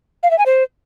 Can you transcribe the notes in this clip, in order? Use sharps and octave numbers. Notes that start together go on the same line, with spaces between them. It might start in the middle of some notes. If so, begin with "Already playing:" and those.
F5
E5
G#5
C5